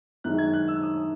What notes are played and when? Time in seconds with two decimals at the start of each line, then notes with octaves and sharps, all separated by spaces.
0.24 F#2 D#3 G#3 F#6
0.38 G#6
0.53 F#6
0.68 E6
0.82 D#6